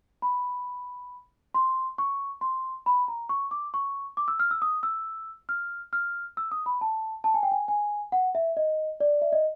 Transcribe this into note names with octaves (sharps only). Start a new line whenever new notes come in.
B5
C6
C#6
C6
B5
A#5
C#6
D6
C#6
D6
E6
F6
E6
D#6
E6
F6
F6
E6
D#6
B5
A5
A5
G#5
G5
G#5
G#5
F#5
E5
D#5
D5
E5
D#5